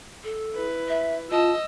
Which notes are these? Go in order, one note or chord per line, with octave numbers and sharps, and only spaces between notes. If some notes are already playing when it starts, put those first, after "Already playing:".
A4
E4 B4
E5
F4 D#5 A5 E6